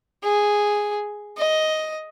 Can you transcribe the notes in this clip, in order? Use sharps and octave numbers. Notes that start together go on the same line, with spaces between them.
G#4
D#5